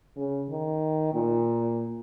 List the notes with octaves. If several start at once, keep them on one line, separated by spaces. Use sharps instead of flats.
C#3
D#3
A#2